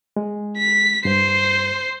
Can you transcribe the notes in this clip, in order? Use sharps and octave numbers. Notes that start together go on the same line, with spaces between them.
G#3
B6
G2 C5 C7